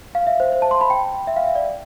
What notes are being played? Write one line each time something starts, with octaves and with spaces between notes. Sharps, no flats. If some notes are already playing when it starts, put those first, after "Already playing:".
F5
E5
C5
C5
A5
C6
B5
G5
E5
F5
E5
D5